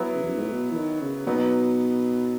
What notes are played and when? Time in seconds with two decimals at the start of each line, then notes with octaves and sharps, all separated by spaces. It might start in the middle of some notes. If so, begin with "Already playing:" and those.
Already playing: F#3 B3 E4
0.15 C#3
0.22 E2
0.30 F#2
0.37 G#2
0.44 A2
0.52 B2
0.72 E3
0.77 D#3
1.02 C#3
1.27 B2 F#3 B3 D#4